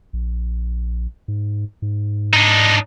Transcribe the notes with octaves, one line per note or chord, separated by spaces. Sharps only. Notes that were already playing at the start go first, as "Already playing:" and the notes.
A#1
G#2
G#2
D4 D#4